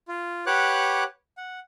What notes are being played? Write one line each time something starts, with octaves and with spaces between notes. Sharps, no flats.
F4
G4 B4 C#5 F#5 D6 F#6
F#5